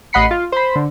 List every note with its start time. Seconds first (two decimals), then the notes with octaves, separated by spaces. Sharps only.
0.13 A1 D#5 F#5 B5 C7 C#7
0.31 F4
0.52 C5 B5
0.76 D3